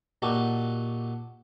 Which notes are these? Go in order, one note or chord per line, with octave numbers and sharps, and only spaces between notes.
A#2 D#4 F#4 G4 A4